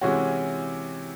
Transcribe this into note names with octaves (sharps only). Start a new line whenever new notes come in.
C3 E3 G#3 C#4 F#4